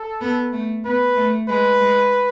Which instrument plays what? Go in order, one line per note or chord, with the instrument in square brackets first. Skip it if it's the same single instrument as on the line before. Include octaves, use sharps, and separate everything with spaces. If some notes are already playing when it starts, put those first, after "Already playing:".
Already playing: [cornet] A4
[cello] B3
A3
[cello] B3 [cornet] B4
[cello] A3
[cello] G#3 [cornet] B4
[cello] G#3